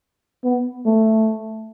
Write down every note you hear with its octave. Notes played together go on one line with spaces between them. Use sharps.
B3
A3